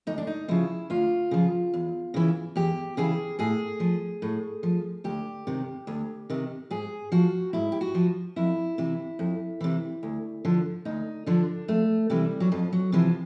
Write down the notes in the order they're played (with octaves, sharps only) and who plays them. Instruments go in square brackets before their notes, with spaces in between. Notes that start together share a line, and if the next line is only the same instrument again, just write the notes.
[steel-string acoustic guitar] D2 D#4
D4
D#4
C#3 F3 E4
D2 F4
C#3 F3
E2
C#3 E3
E2 G4
C#3 E3 G#4
A2 G#4
F3
A2
F3
D2 G4
C3 D#3
D2
C3 D#3
G#2 G#4
F3 F#4
G#2 E4
G4
F#4
F3
F2 E4
C3 E3
F2
C3 E3
D2
D3 F3
D2 D#4
D3 F3 D4
F2 A3
C3 E3 G3
F#3
F2 F3
F#3
C3 E3 F3